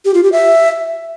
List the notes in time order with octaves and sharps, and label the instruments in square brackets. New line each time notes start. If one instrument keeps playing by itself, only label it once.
[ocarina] G4
F4
G4
E5